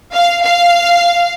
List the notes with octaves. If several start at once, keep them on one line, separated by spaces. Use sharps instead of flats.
F5
F5